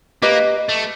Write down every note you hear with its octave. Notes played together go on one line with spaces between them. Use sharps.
A#3 G4 B4 D#5
A3